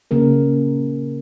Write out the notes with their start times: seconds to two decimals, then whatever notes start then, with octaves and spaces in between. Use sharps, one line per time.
0.11 C#3 A#3 C#4 A#4